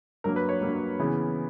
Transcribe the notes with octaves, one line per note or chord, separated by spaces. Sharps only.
G2 F#3 A#3 A#4
B4
C#5
G2 F#3 A#3
C#3 E3 B3